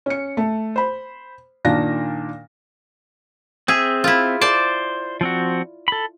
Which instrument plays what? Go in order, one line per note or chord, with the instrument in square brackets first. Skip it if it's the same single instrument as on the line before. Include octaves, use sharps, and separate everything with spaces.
[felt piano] C#4 C#7
A3
C5 B5
A#2 D#3 D4 F5 A#6
[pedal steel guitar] C4 E5 [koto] G#4
[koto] E4 F4
[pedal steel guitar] C5 [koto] D5 A5
[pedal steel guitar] F3 C4 F#4
A4 B5